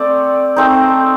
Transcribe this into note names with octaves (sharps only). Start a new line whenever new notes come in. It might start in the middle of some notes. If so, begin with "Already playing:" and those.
Already playing: A3 C4 D5
A3 C4 D#4